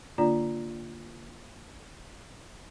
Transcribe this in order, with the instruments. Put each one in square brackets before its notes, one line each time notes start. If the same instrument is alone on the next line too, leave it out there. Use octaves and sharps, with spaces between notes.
[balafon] D3 A#3 D4 F4 D5 A#5